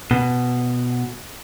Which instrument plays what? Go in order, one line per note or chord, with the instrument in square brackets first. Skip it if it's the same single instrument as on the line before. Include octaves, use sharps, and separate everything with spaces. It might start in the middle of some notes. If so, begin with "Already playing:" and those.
[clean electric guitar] B2